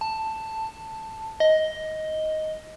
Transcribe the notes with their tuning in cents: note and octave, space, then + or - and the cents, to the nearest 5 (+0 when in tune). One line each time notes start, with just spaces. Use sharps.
A5 +5
D#5 +10